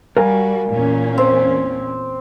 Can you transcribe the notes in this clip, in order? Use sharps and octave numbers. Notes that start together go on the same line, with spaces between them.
G3 F#4 A#4 F5 G#5
E2 A#2 C#4
C4